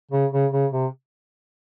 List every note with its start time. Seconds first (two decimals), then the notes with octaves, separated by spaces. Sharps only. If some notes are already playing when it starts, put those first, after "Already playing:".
0.11 C#3
0.32 C#3
0.52 C#3
0.72 C3